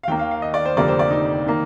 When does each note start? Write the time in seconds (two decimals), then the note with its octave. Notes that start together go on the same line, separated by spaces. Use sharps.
0.03 F5
0.08 D#2 D#3 A#3 G5
0.19 F5
0.31 F5
0.42 D#5
0.54 D5
0.65 C5
0.77 F1 F2 D3 G3 A#3 D5
0.88 C5
0.99 D5
1.11 D#4
1.47 D#3 A#3